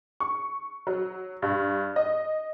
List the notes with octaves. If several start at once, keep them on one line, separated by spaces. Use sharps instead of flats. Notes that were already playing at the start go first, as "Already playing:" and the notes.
C#6
F#3
G2
D#5